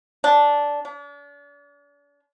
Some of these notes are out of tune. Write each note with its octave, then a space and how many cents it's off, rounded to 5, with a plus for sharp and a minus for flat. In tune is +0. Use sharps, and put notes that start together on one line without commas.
D4 -10
D4 -40